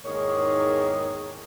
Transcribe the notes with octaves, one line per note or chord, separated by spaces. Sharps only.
E2 G#2 D#3 A#3 G#4 C#5